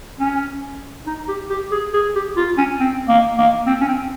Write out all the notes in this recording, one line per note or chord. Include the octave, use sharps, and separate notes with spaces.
C#4
D#4
G4
G4
G#4
G#4
G4
F4
C#4
C4
A#3
A#3
C4
C#4
C4